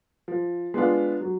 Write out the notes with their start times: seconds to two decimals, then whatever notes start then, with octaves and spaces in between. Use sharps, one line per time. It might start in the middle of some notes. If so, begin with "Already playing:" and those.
0.28 F3
0.74 G#3 B3 D4 F4
1.21 F#3